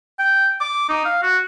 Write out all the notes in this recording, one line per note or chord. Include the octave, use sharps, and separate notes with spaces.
G5
D6
D#4
F5
F#4